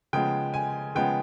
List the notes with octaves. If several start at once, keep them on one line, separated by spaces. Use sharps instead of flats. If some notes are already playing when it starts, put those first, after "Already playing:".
C#3 F3 G#3 B3 G5
G#5
C#3 F3 G#3 B3 G5